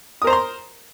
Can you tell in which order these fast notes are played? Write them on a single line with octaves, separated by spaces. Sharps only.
D#6 A#4 C5 A#5 C6